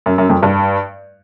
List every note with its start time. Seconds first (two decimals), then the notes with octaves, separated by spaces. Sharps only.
0.06 F#2
0.18 F#2
0.29 F2
0.43 G2